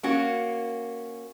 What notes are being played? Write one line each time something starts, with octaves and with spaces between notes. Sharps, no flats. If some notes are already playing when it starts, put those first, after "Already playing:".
A#3 C#4 F#4